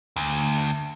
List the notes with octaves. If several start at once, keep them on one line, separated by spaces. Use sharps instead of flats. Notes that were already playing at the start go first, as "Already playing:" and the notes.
D2